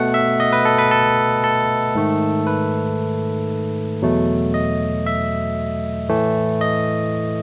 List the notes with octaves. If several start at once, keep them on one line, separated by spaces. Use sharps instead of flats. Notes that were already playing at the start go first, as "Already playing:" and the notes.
Already playing: B2 A3 F#5
E5
D#5
B4
A4
B4
A4
A4
G#2 D#3 A3
B4
E2 B2 F#3 A3
D#5
E5
A2 E3 A3
D#5